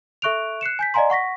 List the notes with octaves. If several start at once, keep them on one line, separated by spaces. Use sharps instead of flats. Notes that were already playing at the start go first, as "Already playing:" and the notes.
A4 E5 C#6 F#6 D7 F7
F#6 C7 C#7 E7
G#5 G6 B6
D5 D#5 F5 G#5 A#5 C6
F#5 C#6 A#6 B6